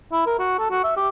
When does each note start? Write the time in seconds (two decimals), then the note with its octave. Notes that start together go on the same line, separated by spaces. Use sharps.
0.12 E4
0.26 A#4
0.39 F#4
0.59 A4
0.71 F#4
0.84 E5
0.97 G4